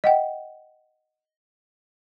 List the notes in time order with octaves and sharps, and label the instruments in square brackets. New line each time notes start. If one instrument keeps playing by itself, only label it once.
[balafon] D#5 F#5 G5